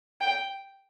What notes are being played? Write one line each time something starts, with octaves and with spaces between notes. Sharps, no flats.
G5